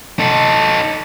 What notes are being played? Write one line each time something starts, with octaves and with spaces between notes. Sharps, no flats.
D#4 A4